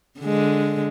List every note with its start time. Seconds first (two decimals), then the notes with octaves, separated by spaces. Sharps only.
0.20 D3 G#3